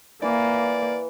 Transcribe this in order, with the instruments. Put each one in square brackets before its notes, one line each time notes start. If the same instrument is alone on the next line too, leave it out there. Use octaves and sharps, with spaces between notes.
[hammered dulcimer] E3 [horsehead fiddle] A#3 [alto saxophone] D5